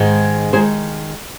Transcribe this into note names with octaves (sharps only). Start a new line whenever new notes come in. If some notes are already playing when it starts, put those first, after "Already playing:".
Already playing: G#2 D#3 G#3
D#3 G#3 G#4 C5